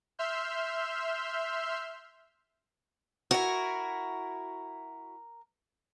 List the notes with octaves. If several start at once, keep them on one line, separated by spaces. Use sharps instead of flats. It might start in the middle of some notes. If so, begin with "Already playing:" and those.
E5 C6 E6 F6 G6
E4 F#4 A#4